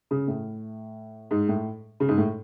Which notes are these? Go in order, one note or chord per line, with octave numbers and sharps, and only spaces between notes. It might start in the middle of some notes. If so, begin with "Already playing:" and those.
C#3
A2
G#2
A2
C#3
G#2
A2